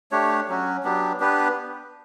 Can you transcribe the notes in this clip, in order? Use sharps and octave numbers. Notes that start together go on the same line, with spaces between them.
A3 D4 G4 C#5
F#3 C#4 F#4
F#3 B3 D4 G4
B3 D4 G4 B4